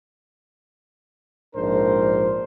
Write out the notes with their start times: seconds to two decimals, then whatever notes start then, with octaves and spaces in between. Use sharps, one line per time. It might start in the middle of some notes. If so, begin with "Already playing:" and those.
1.55 A#1 G#2 D4 A#4 C5